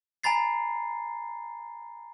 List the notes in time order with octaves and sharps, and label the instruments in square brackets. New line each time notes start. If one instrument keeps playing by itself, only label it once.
[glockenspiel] G#5 A#5 B5 A6 C7